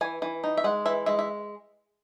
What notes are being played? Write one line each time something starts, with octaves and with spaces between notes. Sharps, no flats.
E3 G#5
E3
D#4
E5
G#3 F#5
E3 E5
G#3 E5
E5